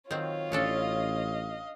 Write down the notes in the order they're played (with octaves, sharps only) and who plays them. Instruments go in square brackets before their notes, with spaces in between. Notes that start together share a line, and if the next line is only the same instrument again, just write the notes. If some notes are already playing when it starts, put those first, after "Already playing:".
[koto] D#3 F#3 C4 [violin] F4 C#5
[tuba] A1 [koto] C#4 D4 A4 [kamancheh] D#5 F5